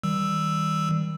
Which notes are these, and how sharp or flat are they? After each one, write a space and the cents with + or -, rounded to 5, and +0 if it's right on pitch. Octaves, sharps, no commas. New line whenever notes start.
D#3 +35 G3 +0 E6 +0